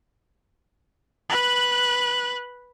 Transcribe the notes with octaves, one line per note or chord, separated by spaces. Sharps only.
B4 F#6